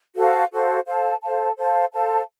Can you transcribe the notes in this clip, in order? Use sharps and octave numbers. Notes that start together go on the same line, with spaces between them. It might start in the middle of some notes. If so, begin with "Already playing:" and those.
F#4 A4 C5 F5
F#4 A4 C5 F5
A4 C5 F5 A5
A4 C5 F5 A5
A4 C5 F5 A5
A4 C5 F5 A5